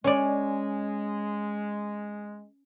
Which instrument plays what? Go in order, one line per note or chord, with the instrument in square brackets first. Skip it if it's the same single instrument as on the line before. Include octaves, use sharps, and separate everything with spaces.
[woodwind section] G#3 [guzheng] C#4 D5